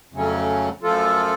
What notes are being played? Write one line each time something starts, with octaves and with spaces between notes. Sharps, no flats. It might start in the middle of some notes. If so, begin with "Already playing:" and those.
F2 C#3 F#3 A3 C#4
F#2 F3 A3 F4 A4